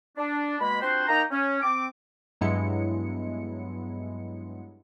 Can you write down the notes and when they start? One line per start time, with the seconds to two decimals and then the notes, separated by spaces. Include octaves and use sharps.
0.17 D4
0.59 B2 G#3 A#3 B5
0.81 C4 D4 F4 F#4 C5
1.08 A#3 D#4 D#5 G5 A#5
1.31 C#4
1.62 C4 D6
2.41 G2 F#3 G#3 B3 E4 C#7